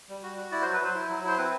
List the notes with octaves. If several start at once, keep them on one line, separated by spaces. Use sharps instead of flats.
G3
F#4
F#4
E4 D5
F#3 C5
B4
F#3 C5
E4
F#3
E4 C5
C4 B4